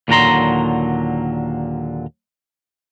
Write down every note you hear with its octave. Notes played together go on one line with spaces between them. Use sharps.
D#2 A#2 D3 F#3 A#5 C6